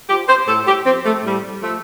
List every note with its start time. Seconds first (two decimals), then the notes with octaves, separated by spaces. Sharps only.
0.09 F3 G4
0.28 C5
0.48 A2 A4
0.67 G4
0.86 F3 C4
1.05 A3
1.24 A2 G3
1.62 F3 A3